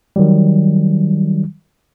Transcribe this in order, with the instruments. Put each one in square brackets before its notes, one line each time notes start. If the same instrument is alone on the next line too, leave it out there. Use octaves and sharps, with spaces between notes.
[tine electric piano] D#3 F#3 G3